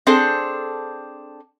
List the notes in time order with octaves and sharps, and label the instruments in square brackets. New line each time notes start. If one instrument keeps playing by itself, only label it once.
[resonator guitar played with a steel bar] C4 D4 G#4 A4 C5